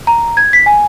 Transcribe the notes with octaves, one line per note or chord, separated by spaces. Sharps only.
A#5
G#6
B6
G#5